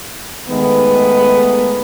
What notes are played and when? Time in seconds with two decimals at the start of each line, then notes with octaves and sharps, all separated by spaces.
0.50 D#3 G#3 A3 B3